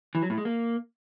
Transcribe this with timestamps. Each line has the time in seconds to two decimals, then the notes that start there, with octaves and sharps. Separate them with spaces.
0.15 E3
0.22 F#3
0.30 A2
0.38 G#3
0.45 A#3